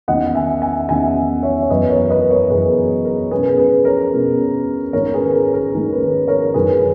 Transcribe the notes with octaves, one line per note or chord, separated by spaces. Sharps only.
E2 D#3 A#3 C#4 D#5 F#5
E5 G#5
E5 G#5
E2 D#3 A#3 C#4 E5 G#5
C#5 E5
C#5
F#2 E3 B3 B4 D#5
A#4 C#5
B4 D#5
A#4 C#5
F#2 E3 B3 G#4 B4
A#4
A#4
B2 G#3 C#4 G#4 B4
G#4 B4
A#4 C#5
B2 G#3 C#4
G#2 D#3 A#3 C#4 A#4 C#5
G#4 B4
A#4
A#4
G#2 D#3 A#3 C#4 G#4
B4
A#4
A#4 C#5
F#2 D#3 G#3 G#4 B4